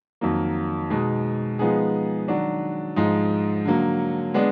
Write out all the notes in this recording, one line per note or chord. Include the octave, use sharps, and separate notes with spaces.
F2 D#3 F#3 A#3
B2 G#3 D#4
F3 G#3 B3 D#4 G#4
D#3 F#3 D4 F#4
G#2 F3 G#3 D#4
D3 F#3 A#3
G#3 B3 D4